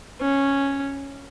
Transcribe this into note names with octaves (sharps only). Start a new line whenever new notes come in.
C#4